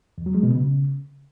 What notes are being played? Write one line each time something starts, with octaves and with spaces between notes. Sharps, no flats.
E2
F#3
G#3
B2
C#3